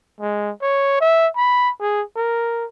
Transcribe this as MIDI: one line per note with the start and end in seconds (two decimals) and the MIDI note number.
0.21 0.51 56
0.62 0.96 73
1.01 1.28 76
1.36 1.71 83
1.80 2.03 68
2.16 2.66 70